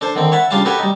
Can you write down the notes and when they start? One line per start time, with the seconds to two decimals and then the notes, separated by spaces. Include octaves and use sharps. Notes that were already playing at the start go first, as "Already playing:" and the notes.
0.01 D4 A4 C5
0.15 D3 D#3 C4
0.32 C#5 E5 F#5 A5 B5
0.51 C#3 G3 D4 F4 F5 A5
0.65 B3 F#4 G4 A4 B4 C#5
0.79 G3 D#4